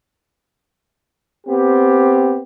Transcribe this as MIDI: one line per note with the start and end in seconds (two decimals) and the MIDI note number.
1.47 2.40 59
1.47 2.40 60
1.47 2.40 67